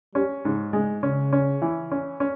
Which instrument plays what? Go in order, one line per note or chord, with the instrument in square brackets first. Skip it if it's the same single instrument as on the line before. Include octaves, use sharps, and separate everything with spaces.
[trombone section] G3 [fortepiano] C#4
[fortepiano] G#2 [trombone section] C#3
[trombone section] C#3 [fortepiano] G#3
[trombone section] C#3 [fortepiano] C#4
[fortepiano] C#4
E3
C#4
C#4